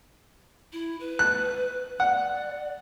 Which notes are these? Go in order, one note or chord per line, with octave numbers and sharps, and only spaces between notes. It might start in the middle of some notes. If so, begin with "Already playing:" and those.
E4
B4
F#6
D5 F#5